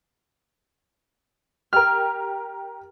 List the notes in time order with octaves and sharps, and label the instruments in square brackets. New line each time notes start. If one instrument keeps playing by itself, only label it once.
[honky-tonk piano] G4 A#4 [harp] F6